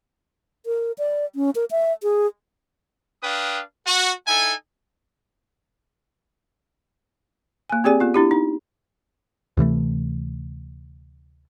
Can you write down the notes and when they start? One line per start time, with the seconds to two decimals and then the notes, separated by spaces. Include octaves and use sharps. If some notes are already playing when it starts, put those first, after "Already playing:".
0.66 A#4
0.98 D5
1.35 C#4
1.55 A#4
1.71 E5
2.03 G#4
3.23 D4 B4 F5 G5 D#6
3.87 F#4
4.28 D#4 E4 A4 G#5
7.70 A#3 G#5
7.84 C4 G4 G#4 D5 G#5
8.00 B3 F4
8.14 D4 E4 G4
8.31 D#4
9.57 D2 C3 E3 A3